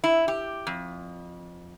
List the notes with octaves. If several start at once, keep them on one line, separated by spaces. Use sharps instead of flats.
E4
G4
F2